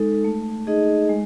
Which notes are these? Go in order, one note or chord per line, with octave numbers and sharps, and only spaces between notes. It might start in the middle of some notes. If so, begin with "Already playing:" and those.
Already playing: G#3 D#4 A4
A3
D#4 G#4 D#5
G#3